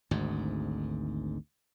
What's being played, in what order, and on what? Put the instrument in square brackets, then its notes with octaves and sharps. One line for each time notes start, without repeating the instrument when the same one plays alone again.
[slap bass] G#1 D2 G#2